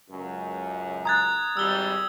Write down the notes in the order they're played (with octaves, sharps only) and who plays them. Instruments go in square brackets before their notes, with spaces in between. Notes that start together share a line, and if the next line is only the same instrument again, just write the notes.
[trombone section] C#2 F#2
[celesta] A#5 F#6 [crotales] D#6 G#6 A6
[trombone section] G#1 G3 [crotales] E6 G7